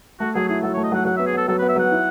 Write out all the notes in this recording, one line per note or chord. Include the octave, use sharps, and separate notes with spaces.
A3 F#4
F#3 G#4
E4 G#4
F#3 A4
C#5
A3
D#5
F#3 F#5
F#3 F#5
B3 E5
G#4
B3 A4
F#3 A4
B4
B3
E5
F#3 F#5
E4